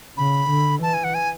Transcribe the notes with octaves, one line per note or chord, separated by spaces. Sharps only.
C#3 B5
D3
E3 A5
G#5
F#5
G#5